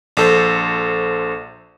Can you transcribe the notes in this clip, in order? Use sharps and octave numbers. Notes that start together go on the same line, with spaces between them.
A#1 A4 C5